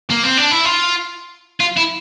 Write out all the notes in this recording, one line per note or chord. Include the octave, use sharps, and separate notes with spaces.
A#3
C4
D4
E4
F4
F4
E4